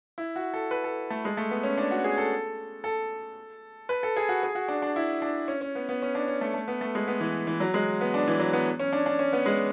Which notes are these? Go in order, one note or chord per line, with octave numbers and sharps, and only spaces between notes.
E4
F#4
A4
B4
A4
A3
G#3
A3
B3
C#4
D4
F#4
G#4
A4
A4
B4
A4
G#4
F#4
G#4
F#4
D4
D4
E4
D4
C#4
C#4
B3
B3
C#4
D4
C#4
A3
A3
B3
A3
G#3
B3
E3
E3
F#3
G#3
B3
D4
E3
F#3
B3
C#4
D4
D4
C#4
B3
G#3